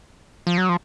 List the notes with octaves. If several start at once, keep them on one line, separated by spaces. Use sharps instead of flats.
F3
F#3
F3